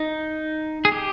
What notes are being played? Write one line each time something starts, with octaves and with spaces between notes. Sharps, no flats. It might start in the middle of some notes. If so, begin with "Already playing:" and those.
Already playing: D#4
G#4
G4